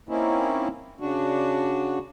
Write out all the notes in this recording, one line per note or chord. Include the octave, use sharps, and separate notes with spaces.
A#3 C4 C#4 D#4 E4
C#3 D4 F#4